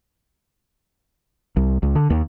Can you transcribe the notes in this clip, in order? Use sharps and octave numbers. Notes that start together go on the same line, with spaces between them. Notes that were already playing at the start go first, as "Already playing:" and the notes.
C2
C#2
D3
D#2